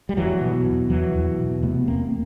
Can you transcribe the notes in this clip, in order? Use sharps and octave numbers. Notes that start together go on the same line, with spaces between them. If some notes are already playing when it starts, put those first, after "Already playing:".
G3
E2 E3 F#3
B2
E2
E2 E3 F#3
E2
B2
C3 A3 B3
E2 A#3 C4